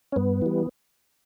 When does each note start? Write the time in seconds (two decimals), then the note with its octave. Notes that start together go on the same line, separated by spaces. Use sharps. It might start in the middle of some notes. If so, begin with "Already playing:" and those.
0.12 C#4
0.16 G2 B3
0.42 E3 G3